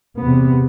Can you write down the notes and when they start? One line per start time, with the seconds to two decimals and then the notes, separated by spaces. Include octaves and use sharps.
0.20 E2 C3 B3